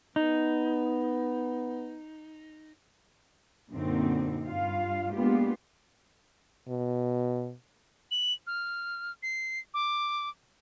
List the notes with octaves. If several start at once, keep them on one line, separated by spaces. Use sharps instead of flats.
B3 D#4
F#2 A#2 D3 C4 D#4
G2 F4 F5
G#3 A#3 B3 D4 F4 G4
B2
F#7
F6
C7
D6